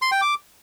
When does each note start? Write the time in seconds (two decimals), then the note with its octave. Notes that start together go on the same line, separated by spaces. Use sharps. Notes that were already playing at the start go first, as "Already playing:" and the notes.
0.02 C6
0.12 G5
0.21 D6